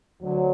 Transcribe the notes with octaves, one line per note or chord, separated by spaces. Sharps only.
D2 D3 F#3